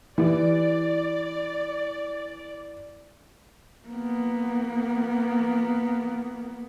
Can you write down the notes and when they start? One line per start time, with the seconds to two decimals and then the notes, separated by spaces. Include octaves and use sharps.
0.18 E3 E4 G4 D5
3.89 A#3 B3